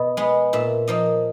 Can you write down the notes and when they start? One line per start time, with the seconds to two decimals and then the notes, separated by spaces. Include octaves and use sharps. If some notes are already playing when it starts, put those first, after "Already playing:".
Already playing: B2 D#5
0.17 G#3 B3
0.53 A#2 E5
0.88 F3 A#3 D#5